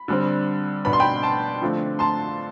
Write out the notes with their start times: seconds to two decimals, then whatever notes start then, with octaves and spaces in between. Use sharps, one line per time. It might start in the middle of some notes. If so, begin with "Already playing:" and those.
Already playing: B5
0.08 D3 G3 C4
0.85 B2 B3 D4 B5
0.93 C6
1.00 G5 B5
1.23 A5 C6
1.62 D3 F3 A3 C4
1.99 A5 C6